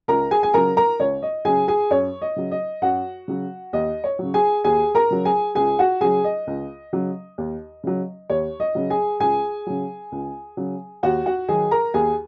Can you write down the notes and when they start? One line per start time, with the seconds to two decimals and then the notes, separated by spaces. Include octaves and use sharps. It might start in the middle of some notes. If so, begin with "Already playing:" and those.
0.08 C#2 A#4 A#5
0.31 G#4 G#5
0.43 G#5
0.54 C#3 F#3 A#4 A#5
0.77 A#4 A#5
1.00 C#2 C#5
1.22 D#5
1.45 C#3 F#3 G#4 G#5
1.68 G#4 G#5
1.91 F#2 C#5
2.22 D#5
2.36 C#3 F#3
2.51 D#5
2.82 F#2 F#4 F#5
3.28 C#3 F#3
3.73 D#2 D#5
4.04 C#5
4.19 C#3 F#3
4.34 G#4 G#5
4.64 D#2 G#4 G#5
4.95 A#4 A#5
5.11 C#3 F#3
5.25 G#4 G#5
5.55 C#2 G#4 G#5
5.79 F#4 F#5
6.01 C#3 F#3 G#4 G#5
6.24 D#5
6.47 C#2
6.93 C#3 F#3
7.38 D#2
7.84 C#3 F#3
8.30 D#2 C#5
8.60 D#5
8.75 C#3 F#3
8.90 G#4 G#5
9.20 C#2 G#4 G#5
9.67 C#3 F#3
10.12 C#2
10.57 C#3 F#3
11.03 D#2 F#4 F#5
11.26 F#4 F#5
11.48 D#3 F#3 G#4 G#5
11.71 A#4 A#5
11.94 D#2 G#4 G#5